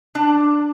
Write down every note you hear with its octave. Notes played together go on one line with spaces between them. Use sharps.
D4